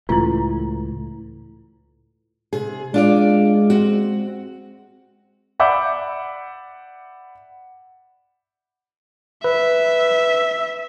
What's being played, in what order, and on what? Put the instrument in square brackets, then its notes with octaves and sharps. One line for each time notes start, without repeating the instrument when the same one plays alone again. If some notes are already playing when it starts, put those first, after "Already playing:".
[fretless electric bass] C#2 A2 E3 [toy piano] E4 F4
[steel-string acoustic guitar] C3 G#4
[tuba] G#3 [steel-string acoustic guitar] D4 F4 D5
[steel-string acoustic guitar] C4 F#4
[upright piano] D5 E5 F#5 B5 D6 G6
[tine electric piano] B4 [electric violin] E5